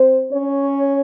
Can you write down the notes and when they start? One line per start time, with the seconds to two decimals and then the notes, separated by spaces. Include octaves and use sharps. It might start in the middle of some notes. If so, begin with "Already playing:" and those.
Already playing: C4 C5
0.32 C#4 C#5